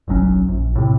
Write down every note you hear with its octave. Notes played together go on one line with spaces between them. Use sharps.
F#1 B1 F#3 C#4
A#1
A2 C3